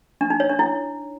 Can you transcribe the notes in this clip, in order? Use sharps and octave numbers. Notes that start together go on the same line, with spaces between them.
D4
D#4
C#5
D4
E4